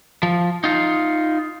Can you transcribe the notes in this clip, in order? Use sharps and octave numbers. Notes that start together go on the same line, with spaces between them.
F3
D#4 F4